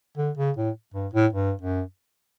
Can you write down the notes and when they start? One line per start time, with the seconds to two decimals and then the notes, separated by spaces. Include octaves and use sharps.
0.17 D3
0.37 C#3
0.57 A2
0.94 G2
1.13 A2
1.33 G2
1.61 F#2